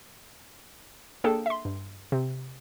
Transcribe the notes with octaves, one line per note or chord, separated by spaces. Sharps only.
A#3 D4 G#4 A4 G5 A5
E5 C6
G2
C3